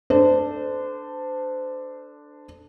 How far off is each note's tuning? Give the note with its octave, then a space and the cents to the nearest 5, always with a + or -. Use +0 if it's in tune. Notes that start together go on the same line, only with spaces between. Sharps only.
D4 +5 A4 +0 C5 -30